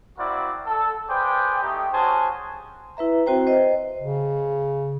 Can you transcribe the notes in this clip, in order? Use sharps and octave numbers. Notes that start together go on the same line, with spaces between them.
A#3 C4 E4 F#4 D5 F#5
A4
G#4 B4 C5 D5 G5
A3 D#4 G4
C#4 F#4 G#4 C5 G#5 A5
E4 B4 E5 A#5
C4 F#4 C5 G5 A#5
C5 D#5
C#3